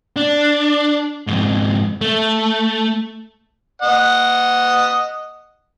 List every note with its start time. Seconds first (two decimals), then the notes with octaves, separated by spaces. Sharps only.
0.16 D4
1.27 F2 G#2
2.01 A3
3.82 D#5 F#5